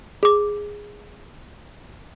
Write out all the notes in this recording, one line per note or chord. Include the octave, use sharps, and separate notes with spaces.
G#4 D6